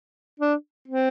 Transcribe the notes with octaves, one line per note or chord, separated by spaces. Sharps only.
D4
C4